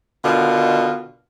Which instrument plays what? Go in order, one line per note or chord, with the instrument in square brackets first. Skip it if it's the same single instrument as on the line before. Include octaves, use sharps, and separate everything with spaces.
[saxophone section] B2 D3 D#3 F4